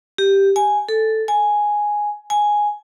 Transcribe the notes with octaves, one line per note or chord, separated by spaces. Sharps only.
G4
G#5
A4
G#5
G#5